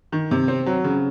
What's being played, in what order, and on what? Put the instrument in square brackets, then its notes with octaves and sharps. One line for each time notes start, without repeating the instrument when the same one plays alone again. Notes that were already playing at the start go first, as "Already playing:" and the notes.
[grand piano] D#3
C3
C4
F#3
C#3